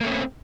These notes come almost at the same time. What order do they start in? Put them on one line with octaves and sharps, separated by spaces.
A#3 A3 C#4 C4